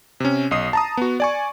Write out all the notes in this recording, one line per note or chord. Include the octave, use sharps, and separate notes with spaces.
C3 C#4
B1 D#5 D#6 C7
A5 A#5 D#6
B3 F#4
D5 G#5 C#6